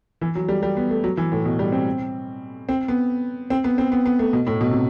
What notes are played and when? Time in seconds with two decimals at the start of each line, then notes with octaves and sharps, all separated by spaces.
0.21 E3
0.35 F#3
0.49 G3
0.63 G3
0.77 B3
0.90 A3
1.04 F#3
1.17 E3
1.32 A2
1.45 B2
1.59 G3
1.72 C4
2.69 C4
2.88 B3
3.50 C4
3.64 B3
3.78 C4
3.92 B3
4.06 B3
4.19 A3
4.33 B2
4.47 A2
4.61 B2
4.71 C3